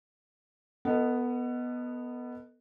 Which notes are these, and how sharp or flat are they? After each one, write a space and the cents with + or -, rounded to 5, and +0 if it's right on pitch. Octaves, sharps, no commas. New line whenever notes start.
B3 +0 A4 +35 D#5 +0